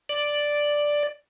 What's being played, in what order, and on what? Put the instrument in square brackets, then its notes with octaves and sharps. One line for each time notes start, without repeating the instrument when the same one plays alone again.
[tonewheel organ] D5